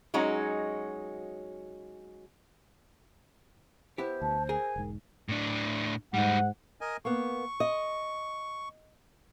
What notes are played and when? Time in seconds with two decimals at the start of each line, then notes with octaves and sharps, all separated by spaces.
0.14 F#3 G#3 C#4 D#4 F#4
3.98 B3 E4 G4 C5
4.22 D2 A5
4.49 G#4 A#4 G#5
4.76 E1 G#2
5.29 A2 D4
6.14 G#2 G3 D#4 F#5
6.81 A#4 D#5 G#5
7.05 A#3 B3 C#6
7.60 D#5